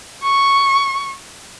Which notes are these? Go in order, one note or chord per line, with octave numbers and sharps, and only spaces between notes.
C#6